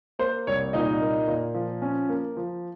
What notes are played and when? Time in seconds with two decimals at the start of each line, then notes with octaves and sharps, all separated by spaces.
0.19 A#3 C5
0.47 C2 C#5
0.73 A#2 D#4 D#5
1.01 A#3
1.27 A#2
1.55 F3
1.82 C#4
2.09 A#3
2.37 F3